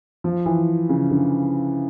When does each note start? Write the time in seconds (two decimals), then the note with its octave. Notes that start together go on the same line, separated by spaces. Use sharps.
0.24 F3
0.46 E3
0.89 C#3
1.11 D3